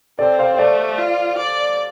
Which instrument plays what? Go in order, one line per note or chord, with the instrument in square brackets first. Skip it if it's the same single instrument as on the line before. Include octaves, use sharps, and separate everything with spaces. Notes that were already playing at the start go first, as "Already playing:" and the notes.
[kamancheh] C4 [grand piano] A4 D5
[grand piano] C5 F5
C5
[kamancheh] A3 [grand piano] A4 D5
[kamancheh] F4
D5